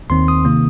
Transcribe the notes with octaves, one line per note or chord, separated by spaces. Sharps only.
D#2 D#3 C4 C6
D#6
C3 D#3 A#3